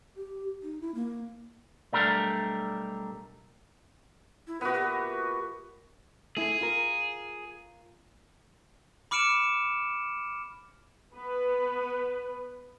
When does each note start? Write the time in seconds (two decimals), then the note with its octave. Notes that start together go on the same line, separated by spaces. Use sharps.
0.17 G4
0.63 D#4
0.81 E4
0.95 A#3
1.93 B1 G3 A3 D4 A#4
4.48 E4
4.61 A#2 B3 F#4 B4 E5
4.74 G4
6.37 A3 E4 G#4
6.61 F4 A#4
9.11 B5 D6 F6 C#7 D7 E7
11.13 B3 B4